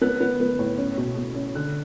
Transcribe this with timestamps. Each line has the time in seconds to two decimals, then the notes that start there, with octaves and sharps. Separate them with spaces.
0.01 B3 F#6
0.21 B3
0.40 B3
0.59 A2
0.78 C#4
0.97 B2
1.17 B2
1.35 C#4
1.55 D3 F#6